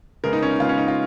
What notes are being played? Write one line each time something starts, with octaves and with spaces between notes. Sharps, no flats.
C#3 G#3 B3 A#4
D#4
C#4
D#4
C#3 G#3 B3 F4
C#4
D#4
F4